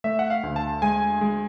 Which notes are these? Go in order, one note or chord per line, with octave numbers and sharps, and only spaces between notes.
A3 E5
F#5
F5
D2
A5
G#3 G#5
G#3